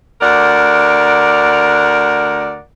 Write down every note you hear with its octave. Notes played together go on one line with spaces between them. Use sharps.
D2 A#4 D5 F#5